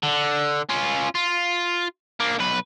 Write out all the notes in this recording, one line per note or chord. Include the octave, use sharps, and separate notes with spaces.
D3
C#4 F4
F4
A#3 D4
B1 B4